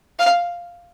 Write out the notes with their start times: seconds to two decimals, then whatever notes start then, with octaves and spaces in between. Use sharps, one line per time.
0.19 F5